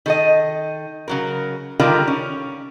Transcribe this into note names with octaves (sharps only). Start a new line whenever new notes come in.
D#3 A4 D#5
C#3 F#3 A#4
D3 D#3 G3 F4 G4 A#4
C#4